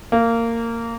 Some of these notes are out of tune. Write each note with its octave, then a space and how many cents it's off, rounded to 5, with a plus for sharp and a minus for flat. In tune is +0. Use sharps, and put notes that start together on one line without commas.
A#3 -20